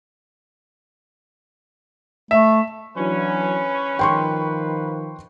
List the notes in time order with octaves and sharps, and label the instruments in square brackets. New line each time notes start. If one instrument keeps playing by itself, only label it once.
[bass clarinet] A3 [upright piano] E5
[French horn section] E3 F#3 D4 [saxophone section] C#4 [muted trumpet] B4
[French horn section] D#3 F3 [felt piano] G5 C6 C#6